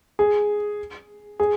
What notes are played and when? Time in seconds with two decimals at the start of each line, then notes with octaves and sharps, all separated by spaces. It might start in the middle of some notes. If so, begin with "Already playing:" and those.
0.19 G#4
1.40 G#4